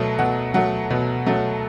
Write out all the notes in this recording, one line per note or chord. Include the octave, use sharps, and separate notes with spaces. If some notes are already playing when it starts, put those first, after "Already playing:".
Already playing: B2 F#3 A3
B2 F#5
F#3 A3 F#5
B2
F#3 A3